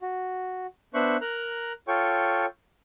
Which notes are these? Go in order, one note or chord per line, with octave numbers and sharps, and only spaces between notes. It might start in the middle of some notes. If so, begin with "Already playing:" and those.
F#4
B3 D4 C5 E5 C#6 F#6
A#4 A#5 F#6
F4 A4 C#5 G5 C#6